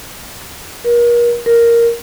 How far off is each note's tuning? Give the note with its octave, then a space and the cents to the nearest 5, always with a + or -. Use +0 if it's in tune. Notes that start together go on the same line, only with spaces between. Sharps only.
A#4 +35
A#4 +0